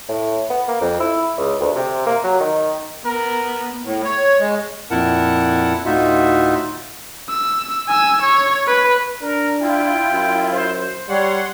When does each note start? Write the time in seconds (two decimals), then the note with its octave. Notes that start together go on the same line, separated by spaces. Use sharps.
0.09 A2
0.50 B3
0.68 A#3
0.81 F2
1.00 E4
1.38 C#2
1.61 D2
1.75 C3
2.07 A#3
2.24 F#3
2.40 D#3
3.05 B3 A#4
3.83 A2
4.05 C#5
4.39 G#3
4.90 F2 A#2 E4 A#4 F#5 A5
5.85 D2 A2 D#4 F4 F#4 E5
7.29 E6
7.88 G#5 E6
8.22 C#5
8.67 B4
9.22 D4 A#4
9.62 E4 F4 G5
10.12 F#2
10.52 C5
11.09 G3 C#5 F#5 C6